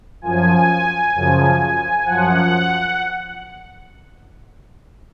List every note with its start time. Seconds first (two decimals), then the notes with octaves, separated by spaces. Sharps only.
0.22 F#2 F3 G#5
1.14 F#2 C#3 F3
2.05 F#2 F3 F#5